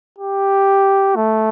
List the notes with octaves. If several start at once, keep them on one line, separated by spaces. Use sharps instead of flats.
G4
A3